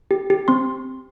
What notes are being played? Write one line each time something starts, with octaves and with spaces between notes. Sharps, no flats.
G4
G4
C4 C6